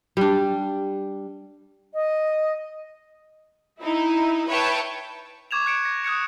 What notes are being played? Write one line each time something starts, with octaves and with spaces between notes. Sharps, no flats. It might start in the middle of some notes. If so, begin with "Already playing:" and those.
G3 D4
D#5
D#4 E4
B4 C#5 E5 G5 A5
C#6 D6 G#6 E7 F7
F#6 G#6 C#7 D7 E7
A#6
D#6 F#6 G#6 C#7